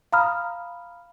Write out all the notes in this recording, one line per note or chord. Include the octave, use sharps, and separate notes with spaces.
F5 A#5 B5 D#6 F6